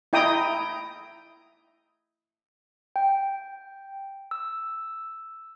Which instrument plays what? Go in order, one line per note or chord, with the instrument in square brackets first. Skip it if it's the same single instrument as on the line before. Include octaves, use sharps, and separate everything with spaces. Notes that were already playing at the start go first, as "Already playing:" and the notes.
[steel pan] E4 D#5 G5 A#5 D#6
[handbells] G5
E6